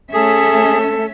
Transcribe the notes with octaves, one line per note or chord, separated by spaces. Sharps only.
A3 C#4 G#4 A4 E5